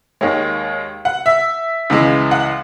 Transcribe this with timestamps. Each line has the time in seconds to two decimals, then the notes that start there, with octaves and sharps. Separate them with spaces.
0.21 D#2 D#3 G#3 C#5
1.05 F#5
1.26 E5
1.90 C#2 C#3 E3 G#3
2.31 F#5